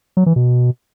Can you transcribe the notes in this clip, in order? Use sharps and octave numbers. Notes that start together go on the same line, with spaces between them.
F#3
E3
B2